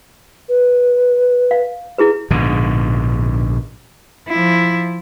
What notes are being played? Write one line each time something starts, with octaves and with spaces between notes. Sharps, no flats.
B4
F5
E4 G#4 B4
A#1 G#2 B2 D3
F3 E4